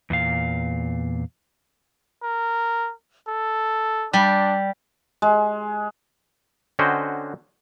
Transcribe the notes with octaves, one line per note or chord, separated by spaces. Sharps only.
E2 A#2 F5
A#4
A4
G3 D4
G#3
D3 C#4 F#4 C5 D#5 G5